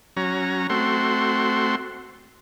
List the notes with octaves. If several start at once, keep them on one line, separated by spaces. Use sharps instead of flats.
F#3 C#4 A#5
A3 C4 F#4 C6